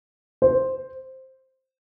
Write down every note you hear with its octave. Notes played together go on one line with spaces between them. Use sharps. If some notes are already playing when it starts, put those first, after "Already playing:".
C5